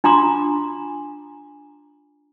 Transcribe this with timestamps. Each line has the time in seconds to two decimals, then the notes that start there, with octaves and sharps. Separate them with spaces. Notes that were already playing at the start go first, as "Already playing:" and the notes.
0.04 D4 F4 G#5 A#5 C6 D6